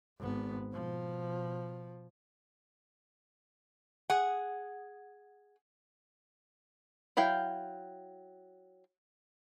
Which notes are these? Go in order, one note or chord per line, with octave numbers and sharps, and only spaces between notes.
G#1 B3
B2 F3
G#4 F#5
F#3 E4 F5 G5